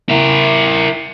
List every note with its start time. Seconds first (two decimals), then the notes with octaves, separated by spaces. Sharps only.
0.09 E4 A#4